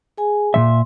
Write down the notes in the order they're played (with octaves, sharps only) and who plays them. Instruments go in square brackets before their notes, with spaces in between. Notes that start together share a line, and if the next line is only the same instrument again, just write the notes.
[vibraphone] G#4 G#5
[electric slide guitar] A#2 F3 E5 [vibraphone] C6